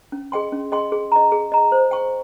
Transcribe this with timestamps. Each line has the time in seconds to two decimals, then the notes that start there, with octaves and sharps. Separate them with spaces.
0.12 C#4
0.32 G#4 D#5 G5 C6
0.52 C#4
0.72 G#4 D#5 G5 C6
0.92 G#4
1.12 D#5 A#5
1.32 G#4
1.52 D#5 A#5
1.72 C5
1.91 G5 C#6